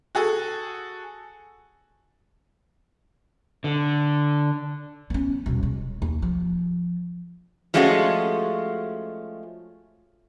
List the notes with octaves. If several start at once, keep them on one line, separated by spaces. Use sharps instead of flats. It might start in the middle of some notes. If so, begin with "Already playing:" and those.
F#4 G#4 A4
D3
B3 C#4
D#1 B2
G#3
D#2
F3
F3 G#3 A3 C#4 F4 F#4